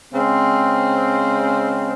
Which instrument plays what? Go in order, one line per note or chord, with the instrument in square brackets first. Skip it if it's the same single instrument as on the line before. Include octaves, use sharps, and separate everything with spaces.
[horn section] C#3 G#3 C4